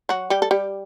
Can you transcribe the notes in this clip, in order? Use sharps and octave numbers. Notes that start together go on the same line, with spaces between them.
F#3 F#4
G3 G4
A4
G3 G4